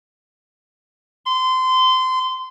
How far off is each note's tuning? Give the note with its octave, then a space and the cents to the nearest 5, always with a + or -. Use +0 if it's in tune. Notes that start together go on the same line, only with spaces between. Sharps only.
C6 -25